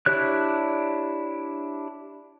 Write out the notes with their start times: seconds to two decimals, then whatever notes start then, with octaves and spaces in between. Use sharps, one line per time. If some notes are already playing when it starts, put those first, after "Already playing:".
0.06 D4 E4 G4 C#5 F#6